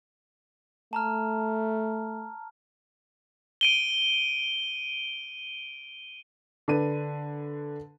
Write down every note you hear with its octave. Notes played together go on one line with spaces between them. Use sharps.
A3 A5 A#5 F6
D7 D#7 G7
D3 D4 B4 D#7